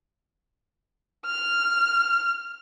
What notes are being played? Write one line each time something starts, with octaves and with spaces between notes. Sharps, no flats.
F6